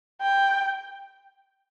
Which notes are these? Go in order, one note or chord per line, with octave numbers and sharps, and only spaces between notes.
G5